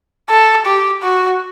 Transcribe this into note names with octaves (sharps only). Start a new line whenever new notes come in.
A4
G4
F#4